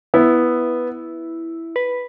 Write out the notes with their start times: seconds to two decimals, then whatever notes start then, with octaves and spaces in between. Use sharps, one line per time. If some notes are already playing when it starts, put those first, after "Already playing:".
0.14 B3 E4
1.76 B4